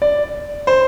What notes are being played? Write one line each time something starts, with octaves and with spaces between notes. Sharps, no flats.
D5
C5